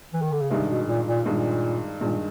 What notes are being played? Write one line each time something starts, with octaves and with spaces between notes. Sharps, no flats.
E3
D#3
D3
C#3
G2 C3 D#3 G#3
B2
A#2
A#2
G2 A#2 D#3 G#3
G2 A#2 D#3 G#3